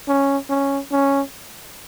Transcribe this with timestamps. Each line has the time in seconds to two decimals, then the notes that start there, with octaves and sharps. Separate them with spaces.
0.08 C#4
0.50 C#4
0.92 C#4